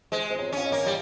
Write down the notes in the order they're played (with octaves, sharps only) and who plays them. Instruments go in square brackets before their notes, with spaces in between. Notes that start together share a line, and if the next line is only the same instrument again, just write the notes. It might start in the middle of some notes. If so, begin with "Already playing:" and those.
[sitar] G#3 [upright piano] C5
[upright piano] C5
C#5
[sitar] C#4 [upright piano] F5
[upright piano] D#5
[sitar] A#3
G3